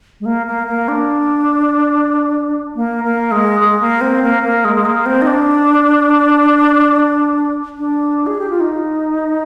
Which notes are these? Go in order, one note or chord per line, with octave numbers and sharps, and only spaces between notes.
G#3
A#3
A#3
A#3
D4
A#3
A#3
G#3
G#3
A#3
C4
A#3
A#3
G#3
G#3
A#3
C4
D#4
D4
D4
G#4
G4
F4
D#4